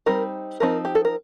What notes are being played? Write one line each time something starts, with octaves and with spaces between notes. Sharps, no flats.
G3 C4 D#4 A#4
F3 C4 D#4 A#4
G4
A4
A#4